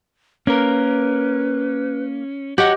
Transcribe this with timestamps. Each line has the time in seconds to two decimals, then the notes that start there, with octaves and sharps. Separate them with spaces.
0.47 A#3 C#4 A#4 B4
2.58 F#4 G4 C#5 D#5 F#5